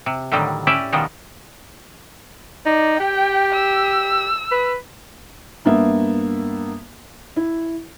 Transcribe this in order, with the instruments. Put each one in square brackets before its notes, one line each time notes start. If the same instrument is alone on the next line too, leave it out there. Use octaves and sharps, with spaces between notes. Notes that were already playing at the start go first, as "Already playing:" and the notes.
[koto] C3
A2 D3 D#3 F#3 G3
C#4 E4 G4 D5 E5
B2 D#3 F3 G3 G#3
[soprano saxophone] D#4 [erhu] D5
[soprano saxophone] G4 [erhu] G5
[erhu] E6
[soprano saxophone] B4
[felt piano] G2 A#3 B3 E5
E4